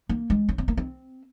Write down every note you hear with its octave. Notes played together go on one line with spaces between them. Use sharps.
A#3
G#3
C#4
C4
A#3
C4